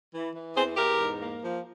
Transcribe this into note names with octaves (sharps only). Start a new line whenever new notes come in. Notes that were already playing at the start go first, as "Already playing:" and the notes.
E3
E3
E2 G#4 C5
E2 G4 A#4
G#2
A#3
F3